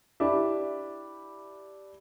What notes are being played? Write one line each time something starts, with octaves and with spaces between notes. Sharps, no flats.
D4 E4 G4 E5